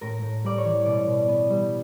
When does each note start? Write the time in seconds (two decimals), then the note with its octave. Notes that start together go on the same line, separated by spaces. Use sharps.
0.01 A2 A#4
0.22 A2
0.44 G3 D5
0.58 C#5
0.65 E3
0.86 B2 D5
1.06 B2
1.28 B3
1.50 G3